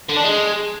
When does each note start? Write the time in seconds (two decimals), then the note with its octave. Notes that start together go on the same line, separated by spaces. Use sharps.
0.09 D3
0.17 D4
0.24 G#3